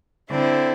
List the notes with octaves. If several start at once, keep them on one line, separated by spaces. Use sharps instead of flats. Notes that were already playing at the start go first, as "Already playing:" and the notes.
D3 C4 E4